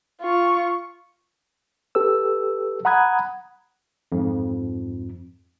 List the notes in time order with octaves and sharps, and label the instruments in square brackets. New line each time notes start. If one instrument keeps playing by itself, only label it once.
[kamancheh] F4 C#6
[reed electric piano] G4 A4 B4 E6
F#5 A#5 B5 D#6 F#6 G#6
[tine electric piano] F2 G#2